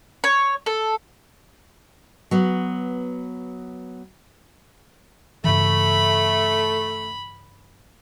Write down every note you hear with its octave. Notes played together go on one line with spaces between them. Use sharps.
C#5
A4
F#3 B3
G2 C#3 E3 A3 B5